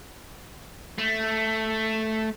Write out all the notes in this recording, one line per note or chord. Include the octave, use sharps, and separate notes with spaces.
A3